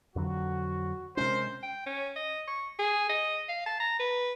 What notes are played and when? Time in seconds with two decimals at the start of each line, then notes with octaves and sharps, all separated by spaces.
0.16 F2 D3 F#3 F#4
1.17 C3 G#3 C#4 A#4 C5
1.63 G5
1.86 C#4
2.16 D#5
2.48 C#6
2.79 G#4
3.09 D#5
3.49 F5
3.66 A5
3.80 A#5
3.99 B4